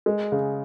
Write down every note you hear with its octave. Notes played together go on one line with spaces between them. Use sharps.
G#3
C#3